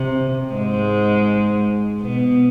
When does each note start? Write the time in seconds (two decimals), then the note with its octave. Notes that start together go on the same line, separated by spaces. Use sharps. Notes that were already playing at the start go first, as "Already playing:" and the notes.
Already playing: C3
0.54 G#2 G#3
2.02 B2 B3